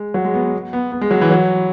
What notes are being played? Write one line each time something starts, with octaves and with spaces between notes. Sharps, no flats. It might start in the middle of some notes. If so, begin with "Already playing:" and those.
Already playing: G#3
F#3
G#3
B3
B3
B3
B3
G#3
F#3
E3
F#3